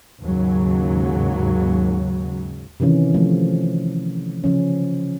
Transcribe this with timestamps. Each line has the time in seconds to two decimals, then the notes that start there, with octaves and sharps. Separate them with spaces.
0.24 D#2 G#2 C#3 F#3
2.80 C3 D#3 E3 C#4
3.14 F3 A3
4.44 C#3 F3 C#4